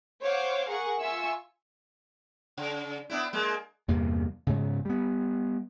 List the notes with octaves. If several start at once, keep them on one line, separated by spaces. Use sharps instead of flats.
C5 C#5 F5 F#5 D6
G#4 A#4 F#5 C#6
F4 E5 G#5 C#6 E6
C#3
B3 D4 E4
G#3 A#3
E2 G2 C3 A#3
G#2 C#3
G3 B3